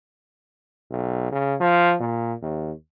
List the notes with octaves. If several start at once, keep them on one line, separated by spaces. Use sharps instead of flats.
B1
C#3
F3
A#2
D#2